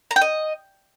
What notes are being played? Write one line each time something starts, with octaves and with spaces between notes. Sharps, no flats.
A#5
G5
D#5